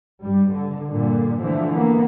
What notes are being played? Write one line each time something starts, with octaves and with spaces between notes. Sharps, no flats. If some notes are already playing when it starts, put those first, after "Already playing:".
G2 G3
D3
G2 A#2 D3
D3 E3 F3 A3
A#3 B3